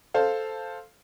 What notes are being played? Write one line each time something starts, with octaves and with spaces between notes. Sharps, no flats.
A4 C5 F5